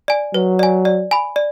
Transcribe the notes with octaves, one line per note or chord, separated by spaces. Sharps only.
D5 G#5
F#3 B4
D5 G#5
D5
G#5 B5
D5